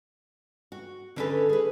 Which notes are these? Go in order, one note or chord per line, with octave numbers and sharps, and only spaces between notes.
F#4
D3 B3 C#4 D#4 A4 B4
G#4 B4